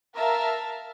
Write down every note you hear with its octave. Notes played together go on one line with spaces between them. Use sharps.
A#4 E5 F5 A5 A#5